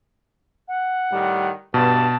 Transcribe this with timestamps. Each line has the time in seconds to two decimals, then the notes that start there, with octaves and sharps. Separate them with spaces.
0.68 F#5
1.11 A2 D#3 G3
1.74 G2 B2 A5